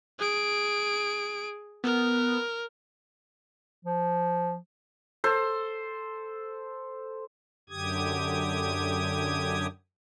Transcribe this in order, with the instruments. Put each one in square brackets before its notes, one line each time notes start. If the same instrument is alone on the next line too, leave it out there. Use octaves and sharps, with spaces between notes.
[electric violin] G#4 D7
[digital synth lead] B3 [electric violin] A#4
[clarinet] F3
[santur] A4 C5
[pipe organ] F#2 D3 G4 D#6 G#6